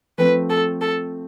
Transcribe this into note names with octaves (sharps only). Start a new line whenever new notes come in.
F3 A3 C4 B4
A4
A4